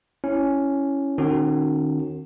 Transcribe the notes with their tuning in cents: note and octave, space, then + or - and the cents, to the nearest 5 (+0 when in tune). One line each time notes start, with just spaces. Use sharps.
C#4 +0 E4 +0
D#3 -35 C4 +45 F#4 +0